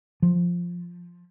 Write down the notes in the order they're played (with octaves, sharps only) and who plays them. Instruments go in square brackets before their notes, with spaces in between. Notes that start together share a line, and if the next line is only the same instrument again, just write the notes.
[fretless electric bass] F3